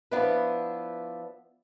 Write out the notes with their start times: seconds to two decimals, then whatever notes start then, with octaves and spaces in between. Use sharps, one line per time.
0.11 F3 B3 D4 E4 B4